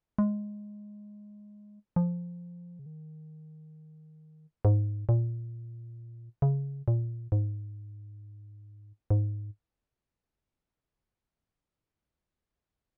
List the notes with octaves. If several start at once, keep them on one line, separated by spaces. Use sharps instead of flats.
G#3
F3
C#3
D#3
G#2
A#2
C#3
A#2
G#2
G#2